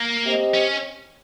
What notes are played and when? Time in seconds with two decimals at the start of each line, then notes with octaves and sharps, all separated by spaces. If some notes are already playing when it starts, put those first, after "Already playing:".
Already playing: A#3
0.24 C4 G4 C5 D#5
0.54 C#4